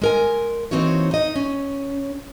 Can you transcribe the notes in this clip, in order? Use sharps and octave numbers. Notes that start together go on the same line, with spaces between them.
G#3 A#4 G#5
E3 A#3 C4 D#4 F#4 C#5
D#4 D#5
C#4